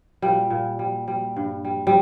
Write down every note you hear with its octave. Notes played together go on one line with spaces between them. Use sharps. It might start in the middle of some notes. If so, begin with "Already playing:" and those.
A#2 G3
A#2
G3
G3
G2
G3
G3